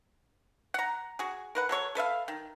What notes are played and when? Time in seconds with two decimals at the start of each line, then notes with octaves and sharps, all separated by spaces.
0.74 F#5 A#5
1.19 F#4 G#4
1.55 A#4 B4 F#5
1.69 F#3 A4 C#5 C#6
1.95 A4 B4 E5 F5
2.28 D#3